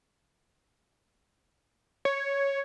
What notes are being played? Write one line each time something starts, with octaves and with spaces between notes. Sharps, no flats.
C#5